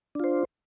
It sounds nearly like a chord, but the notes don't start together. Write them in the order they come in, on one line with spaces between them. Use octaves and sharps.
D4 F4 C5